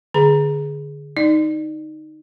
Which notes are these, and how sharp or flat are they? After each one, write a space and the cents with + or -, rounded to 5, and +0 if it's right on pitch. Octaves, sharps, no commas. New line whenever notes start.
D3 +0 G#4 +5 B5 +35
D#4 +0 D5 +25